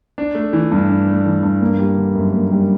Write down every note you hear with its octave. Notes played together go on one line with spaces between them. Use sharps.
D4
A3
E3
G2
D4
A3
E3
G2
A#3
G3
D3
F#2
A#3
G3